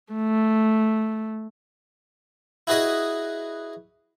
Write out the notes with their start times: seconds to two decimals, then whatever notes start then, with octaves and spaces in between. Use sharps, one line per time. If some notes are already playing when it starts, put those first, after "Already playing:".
0.13 A3
2.67 E4 F#4 G#4 B4 D#5